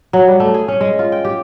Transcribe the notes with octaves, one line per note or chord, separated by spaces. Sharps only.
F#3
G3
A3
G#4
C#4
G#3
F4
G5
G4